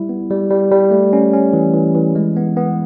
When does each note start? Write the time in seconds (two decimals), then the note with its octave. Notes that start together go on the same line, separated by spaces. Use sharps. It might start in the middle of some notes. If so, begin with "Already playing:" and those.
Already playing: G3 E4
0.09 B3
0.31 G3
0.50 G3
0.71 G3
0.91 A3
1.13 C#4
1.34 C#4
1.53 E3
1.74 E3
1.95 E3
2.15 G#3
2.37 B3
2.57 B3